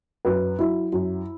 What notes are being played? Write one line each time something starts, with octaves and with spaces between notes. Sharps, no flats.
F#2 B4
F#3 E4
F#2